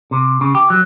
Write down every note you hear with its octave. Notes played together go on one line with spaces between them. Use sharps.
C3
C#3
G4
F#3